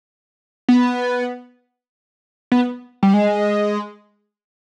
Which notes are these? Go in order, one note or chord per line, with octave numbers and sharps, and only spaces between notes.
B3
B3
G3
G#3